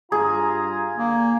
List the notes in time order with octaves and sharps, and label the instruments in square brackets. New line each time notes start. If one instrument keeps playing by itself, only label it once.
[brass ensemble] G2 F4 A#5 [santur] G#4
[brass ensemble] D3 [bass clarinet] A#3